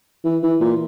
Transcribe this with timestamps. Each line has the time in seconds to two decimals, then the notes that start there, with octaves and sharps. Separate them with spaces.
0.25 E3
0.42 E3
0.61 A#2